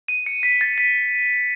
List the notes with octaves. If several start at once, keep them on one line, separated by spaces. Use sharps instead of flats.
D#7
C#7
B6
A6
B6